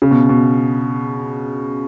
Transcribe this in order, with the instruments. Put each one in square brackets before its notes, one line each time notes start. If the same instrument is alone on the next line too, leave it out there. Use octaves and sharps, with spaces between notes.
[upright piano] C#3
B2
B2